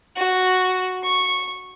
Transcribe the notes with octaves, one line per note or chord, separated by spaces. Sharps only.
F#4
C#6